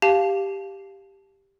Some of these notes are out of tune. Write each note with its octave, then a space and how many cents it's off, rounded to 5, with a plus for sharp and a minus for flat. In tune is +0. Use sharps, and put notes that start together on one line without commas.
G4 +0 F5 +0 A5 -20